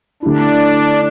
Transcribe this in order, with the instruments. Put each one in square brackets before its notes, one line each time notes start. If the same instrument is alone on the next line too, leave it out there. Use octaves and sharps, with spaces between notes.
[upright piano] D3 A3 E4 [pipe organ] D4